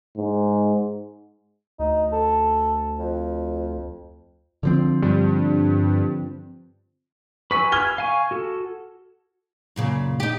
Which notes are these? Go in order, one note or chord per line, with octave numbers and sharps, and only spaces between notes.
G#2
D2 D#4
A4
F2
D3 F3 C4
G2
B4 G#5 C#6 E6 B6
F6 G#6 G7
F5 G#5 C#6
F#4 A4
F#2 A#2 C#3
D#4 G4